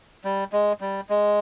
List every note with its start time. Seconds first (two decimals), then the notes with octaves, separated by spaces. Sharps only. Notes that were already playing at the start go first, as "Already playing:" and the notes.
0.24 G3
0.53 G#3
0.81 G3
1.10 G#3